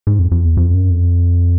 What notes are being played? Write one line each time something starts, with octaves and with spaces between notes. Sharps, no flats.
G#2
F2
F2
E2
F2
F#2
F2